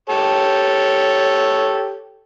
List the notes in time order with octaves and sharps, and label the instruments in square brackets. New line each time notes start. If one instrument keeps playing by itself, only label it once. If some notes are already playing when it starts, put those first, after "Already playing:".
[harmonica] G4 A4 C#5